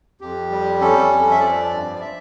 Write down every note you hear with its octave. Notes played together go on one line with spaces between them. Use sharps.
F2 G4
G3
C#4 A4
F2
E5
F3 D5
G2
D5
E5